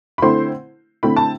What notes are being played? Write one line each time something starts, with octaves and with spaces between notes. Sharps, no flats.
B5
D3 A3 C4 E4 C5 C6
D3 A3 C4 E4 B5
A5